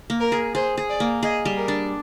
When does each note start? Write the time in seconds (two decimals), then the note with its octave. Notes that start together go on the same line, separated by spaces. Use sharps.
0.10 A#3
0.20 A#4
0.32 G#4
0.55 G#4 C5
0.77 G#4
0.89 D5
1.00 A#3
1.23 G#4 D#5
1.45 G3
1.57 A#4
1.68 D4